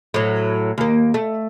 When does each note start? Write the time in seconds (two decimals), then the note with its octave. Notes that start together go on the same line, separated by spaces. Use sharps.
0.14 A2 F#3
0.78 D#2 A#3
1.14 A3